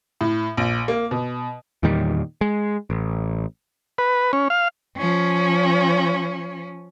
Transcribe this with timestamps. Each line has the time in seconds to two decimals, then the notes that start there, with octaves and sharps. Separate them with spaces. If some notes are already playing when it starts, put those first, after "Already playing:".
0.21 A2
0.57 A#1
0.88 A#3
1.11 B2
1.83 E2 A#2 D#3 G3
2.41 G#3
2.90 A1
3.98 B4
4.33 C#4
4.50 F5
4.97 F3 C#4